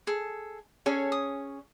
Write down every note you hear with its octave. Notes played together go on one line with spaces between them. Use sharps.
G#4 A4
C#4 G#4 A4 C#5
D#6